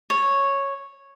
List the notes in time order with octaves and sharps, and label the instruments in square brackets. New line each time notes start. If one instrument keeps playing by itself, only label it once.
[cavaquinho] C#5